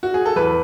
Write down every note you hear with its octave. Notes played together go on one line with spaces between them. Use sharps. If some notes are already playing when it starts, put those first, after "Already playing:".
F#4
G#4
A4
E2 B4